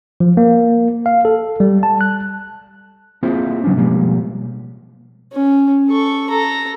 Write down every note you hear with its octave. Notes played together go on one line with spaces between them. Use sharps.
F3
A#3
F5
A4
G3
A5
F#6
A#3 C4 E4 F4 G#4 C5
C#3 F#3 B3 C#4 D4
B2 F3 G3 G#3 A#3
C#4
A4 C#6
A4 A#5